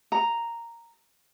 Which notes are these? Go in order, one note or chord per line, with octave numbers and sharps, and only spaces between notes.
A#5